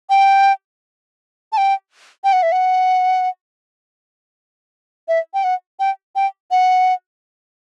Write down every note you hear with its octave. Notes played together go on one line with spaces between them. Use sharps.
G5
A5
G5
G5
F#5
E5
F#5
E5
G5
F#5
G5
G5
F#5